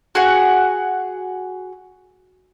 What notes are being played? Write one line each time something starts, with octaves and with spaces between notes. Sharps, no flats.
F#4 G#4 F#5